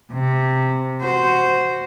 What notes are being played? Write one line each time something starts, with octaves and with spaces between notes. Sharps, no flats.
C3
F#4 C5